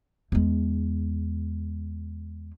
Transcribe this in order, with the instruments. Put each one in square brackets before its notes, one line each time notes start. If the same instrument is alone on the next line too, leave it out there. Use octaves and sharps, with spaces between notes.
[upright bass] E2 G#3